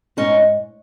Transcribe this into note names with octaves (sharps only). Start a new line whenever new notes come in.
G#2 C#4 D#4